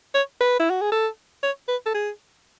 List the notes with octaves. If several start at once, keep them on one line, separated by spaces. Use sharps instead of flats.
C#5
B4
E4
F#4
G#4
A4
C#5
B4
A4
G#4